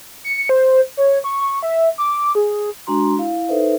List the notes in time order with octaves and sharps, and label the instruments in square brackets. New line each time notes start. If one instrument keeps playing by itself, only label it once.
[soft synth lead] C#7
C5
C#5
C#6
C#6
E5
D6
G#4
[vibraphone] G#3 D4 F#4 A#5 C6
E4 F5
D#4 A4 B4 C5 E5